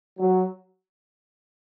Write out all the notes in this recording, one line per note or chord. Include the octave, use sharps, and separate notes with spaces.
F#3